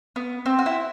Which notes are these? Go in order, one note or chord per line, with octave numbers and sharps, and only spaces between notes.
B3
C4
F#4
E4